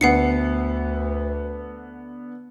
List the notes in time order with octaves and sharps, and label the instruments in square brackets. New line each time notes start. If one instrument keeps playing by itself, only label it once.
[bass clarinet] D2 [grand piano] D3 B3 [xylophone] F#5 C7 C#7